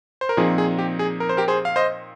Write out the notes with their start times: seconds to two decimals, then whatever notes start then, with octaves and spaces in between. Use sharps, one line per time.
0.21 C5
0.29 A#4
0.37 A#2 F3 C4 D#4 G#4
0.58 G#4
0.79 G4
0.99 G#4
1.20 A#4
1.29 C5
1.37 G4 A#4
1.48 G#4 C5
1.65 F5
1.76 C5 D#5